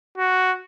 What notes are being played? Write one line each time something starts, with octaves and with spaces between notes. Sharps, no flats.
F#4